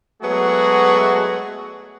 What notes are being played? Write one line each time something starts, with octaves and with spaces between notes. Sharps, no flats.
F#3 G#3 A3 B3 F#4 G#4